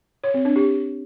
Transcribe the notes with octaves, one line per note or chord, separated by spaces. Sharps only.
C#5
C4
D4
G4